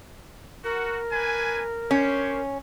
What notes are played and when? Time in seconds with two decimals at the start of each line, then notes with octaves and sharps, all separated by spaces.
0.64 F#4 A#4
1.11 D4 B4 G#5
1.91 C#4 G4 C5 C#5